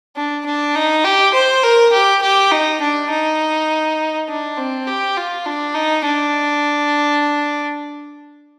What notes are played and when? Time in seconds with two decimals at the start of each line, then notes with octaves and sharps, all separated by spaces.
0.16 D4
0.46 D4
0.75 D#4
1.04 G4
1.34 C5
1.63 A#4
1.92 G4
2.22 G4
2.51 D#4
2.81 D4
3.10 D#4
4.29 D4
4.58 C4
4.87 G4
5.17 F4
5.46 D4
5.74 D#4
6.05 D4